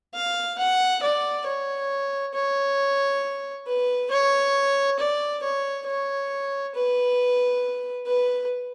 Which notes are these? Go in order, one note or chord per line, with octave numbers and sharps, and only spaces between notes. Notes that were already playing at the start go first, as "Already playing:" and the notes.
F5
F#5
D5
C#5
C#5
B4
C#5
D5
C#5
C#5
B4
B4